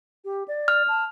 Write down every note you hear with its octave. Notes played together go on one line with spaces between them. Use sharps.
G4
D5
F6
A5